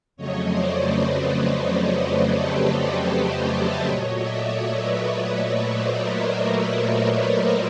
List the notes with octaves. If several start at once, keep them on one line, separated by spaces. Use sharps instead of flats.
F2 C#3 F#3 A3 C#5 D#5
C5 D5
B4 C#5
B4 C#5
G4 A4
B4 C#5
C5 D5
C#5 D#5
D5 E5
A#2 F#3 A3 C#5 D#5
D5 E5
B4 C#5
C5 D5
A#4 C5
A#4 C5
B4 C#5